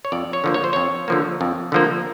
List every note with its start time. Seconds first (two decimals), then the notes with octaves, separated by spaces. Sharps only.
0.05 C#5
0.12 F2 D5
0.33 C#5
0.44 D3 F3 A#3
0.54 C#5
0.64 C5
0.73 F2 C#5
1.08 D3 F3 A#3
1.41 F2
1.72 D3 F3 A#3